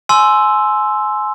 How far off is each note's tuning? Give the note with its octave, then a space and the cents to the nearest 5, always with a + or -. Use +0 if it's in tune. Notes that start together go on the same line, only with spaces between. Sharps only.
G#5 +25 C6 +0 E6 +0